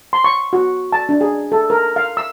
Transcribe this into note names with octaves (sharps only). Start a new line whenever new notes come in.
C6
C#6
F#4
A5
D4
G#4
A4
A#4
F5
E6